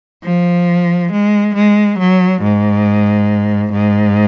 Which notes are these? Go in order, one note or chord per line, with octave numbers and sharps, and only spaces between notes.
F3
G#3
G#3
F#3
G#2
G#2